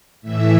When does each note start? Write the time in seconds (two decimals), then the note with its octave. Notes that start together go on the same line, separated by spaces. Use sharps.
0.22 A2 E3 E5